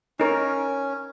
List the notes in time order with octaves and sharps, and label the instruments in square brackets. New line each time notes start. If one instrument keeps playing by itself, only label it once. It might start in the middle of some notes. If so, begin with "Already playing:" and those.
[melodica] C#4 [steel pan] D#4 A#4